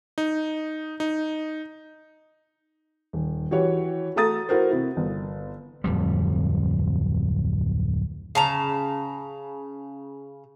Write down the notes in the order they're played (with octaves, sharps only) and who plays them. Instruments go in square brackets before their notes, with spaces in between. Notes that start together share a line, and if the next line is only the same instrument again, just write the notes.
[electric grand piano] D#4
D#4
[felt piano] D#1
E3 F#4 G4 C#5
A3 F#4 A4 A#5 D#6 A6
E4 F#4 A#4 C5
C3 E4
G1
[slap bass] D1 F2 G3
[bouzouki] C#3 A5 A#5